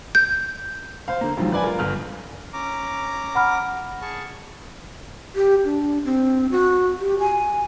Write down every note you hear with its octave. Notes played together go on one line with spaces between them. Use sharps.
G6
C5 F5
D3 A#3
A#1 F2 G#2 D#3 F#3 G3
B4 D5 G#5 B5
F4 A#4
G1 F6
C#4 A#5 D6
F#5 B5 F6
G#4 A5 C#6
G4
D4
C4
F#4
G4
G#5